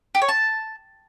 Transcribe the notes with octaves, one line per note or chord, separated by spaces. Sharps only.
G4
C#5
A5